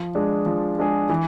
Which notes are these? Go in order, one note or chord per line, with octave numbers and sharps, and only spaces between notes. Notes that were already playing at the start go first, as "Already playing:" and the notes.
Already playing: F3
G#3 D4 G#4
F3
G#3 D4 G#4
E3